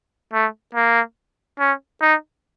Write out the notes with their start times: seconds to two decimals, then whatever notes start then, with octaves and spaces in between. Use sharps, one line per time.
0.33 A3
0.75 A#3
1.59 C#4
2.01 D#4